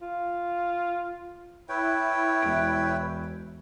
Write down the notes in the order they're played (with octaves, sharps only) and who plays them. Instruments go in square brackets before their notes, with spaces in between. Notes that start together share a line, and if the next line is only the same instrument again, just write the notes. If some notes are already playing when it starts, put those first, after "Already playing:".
[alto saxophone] F4
[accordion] E4 [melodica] B4 C#5 G5
[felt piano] E1 E5 D7